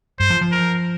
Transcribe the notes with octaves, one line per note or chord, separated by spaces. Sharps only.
G2 C5
F3
F3
A#4